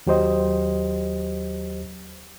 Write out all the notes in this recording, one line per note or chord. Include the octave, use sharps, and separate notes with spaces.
D#2 F#3 G4 C5 D#5